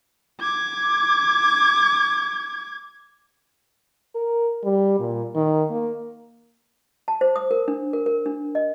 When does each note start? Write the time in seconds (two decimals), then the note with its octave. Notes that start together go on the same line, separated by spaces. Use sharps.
0.40 D6 G#6
4.15 A#4
4.64 G3
5.00 A#2
5.35 D#3
5.70 A#3
7.08 A5
7.21 C5
7.36 D#6
7.51 A#4
7.68 D4
7.93 A#4
8.06 A#4
8.26 D4
8.55 D#5